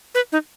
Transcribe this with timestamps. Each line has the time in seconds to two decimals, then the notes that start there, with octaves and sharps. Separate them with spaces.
0.15 B4
0.32 D#4